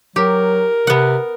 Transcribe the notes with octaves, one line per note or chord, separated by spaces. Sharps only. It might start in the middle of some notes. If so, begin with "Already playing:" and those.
F#3 G4 A#4
C3 B3 F#5